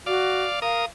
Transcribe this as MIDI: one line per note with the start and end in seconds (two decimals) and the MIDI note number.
0.06 0.44 66
0.06 0.60 74
0.06 0.60 77
0.62 0.85 70
0.62 0.84 77
0.62 0.85 87